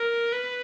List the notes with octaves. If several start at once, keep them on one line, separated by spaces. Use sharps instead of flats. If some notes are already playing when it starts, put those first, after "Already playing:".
Already playing: A#4
B4